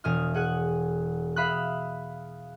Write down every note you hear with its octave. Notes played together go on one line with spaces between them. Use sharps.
E1 G#5 D#6 F6
G#4 F#5 G#5 F#6
E5 F5 B5 D#6 F#6